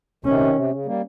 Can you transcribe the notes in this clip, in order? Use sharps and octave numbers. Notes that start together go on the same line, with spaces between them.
C3 D#3 C#4
C3
C#3
G3 A#3